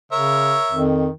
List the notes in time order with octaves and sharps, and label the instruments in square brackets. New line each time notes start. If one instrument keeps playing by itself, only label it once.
[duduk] C#3 [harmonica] A#4 C#5 E5
[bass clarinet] F2 [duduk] D#3